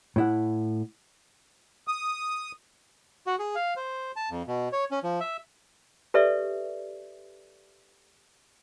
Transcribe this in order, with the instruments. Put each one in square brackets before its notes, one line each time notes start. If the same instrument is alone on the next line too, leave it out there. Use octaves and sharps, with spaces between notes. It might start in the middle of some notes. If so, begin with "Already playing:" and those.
[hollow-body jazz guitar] A2 E4 F#5
[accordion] D#6
[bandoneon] F#4
G#4
F5
C5
A5
F2
B2
C#5
C#4
F3
E5
[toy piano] G4 A4 B4 D5 E5 C#6